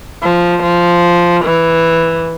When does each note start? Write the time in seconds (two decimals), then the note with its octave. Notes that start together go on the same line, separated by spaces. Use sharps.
0.23 F3
0.63 F3
1.45 E3